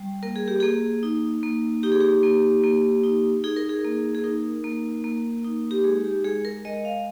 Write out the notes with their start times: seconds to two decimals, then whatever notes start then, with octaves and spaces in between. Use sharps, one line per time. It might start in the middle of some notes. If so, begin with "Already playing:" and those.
Already playing: G3
0.23 A#3 A#4
0.36 G#4
0.48 G4
0.60 A#3 G#4
1.03 D#4
1.43 A#3
1.83 D#4 G4
1.92 G#4
2.00 G4
2.23 A#3
2.63 A#3
3.04 D#4
3.44 D#4 G#4
3.56 A#4
3.69 G#4
3.84 A#3
4.15 G#4
4.24 D#4 A#4
4.64 A#3
5.04 A#3
5.44 D#4
5.71 G4
5.84 G#3 G#4
6.04 G4
6.24 G#3 G#4
6.45 A#4
6.65 G#3 D#5
6.85 F5